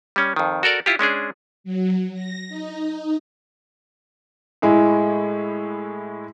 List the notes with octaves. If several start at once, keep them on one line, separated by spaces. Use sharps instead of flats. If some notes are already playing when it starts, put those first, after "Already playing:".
G3 C#4
F2 D#3
F#4 A4 A#4 D5
E4 F4 G4
G#3 C#4 D4 G#4
F#3
A#6
D#4
A2 G#3 E4